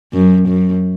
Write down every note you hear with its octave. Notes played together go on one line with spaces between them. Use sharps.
F#2
F#2